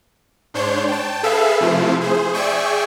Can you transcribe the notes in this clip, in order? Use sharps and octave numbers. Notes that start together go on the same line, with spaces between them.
G#2 D4 C5 C#5 G6
G5 A5
G#4 A4 B4 E5 F5
C3 F3 A3 E4 F4
G#4 C5
G#4 D5 E5 G5 G#5 C#6